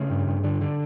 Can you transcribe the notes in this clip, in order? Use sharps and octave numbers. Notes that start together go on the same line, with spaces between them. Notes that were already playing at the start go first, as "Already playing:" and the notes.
Already playing: C#3 A3
G2
G2
D3
D3